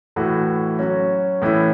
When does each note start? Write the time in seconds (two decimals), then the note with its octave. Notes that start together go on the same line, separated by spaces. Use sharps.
0.16 A2 E3 A3 F#4
0.79 F#3 C#4 F#4
1.42 A2 E3 C#4 E4